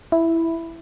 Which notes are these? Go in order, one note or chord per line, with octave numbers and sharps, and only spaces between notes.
E4